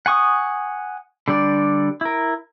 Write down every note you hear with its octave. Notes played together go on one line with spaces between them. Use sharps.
F#5 G#5 C#6 D#6
D3 G3 D4 D5
E4 A#4